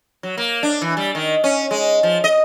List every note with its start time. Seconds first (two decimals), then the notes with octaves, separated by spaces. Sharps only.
0.23 F#3
0.37 A#3
0.63 D4
0.82 E3
0.97 G3
1.15 D#3
1.44 C#4
1.71 G#3
2.03 F3
2.24 D#5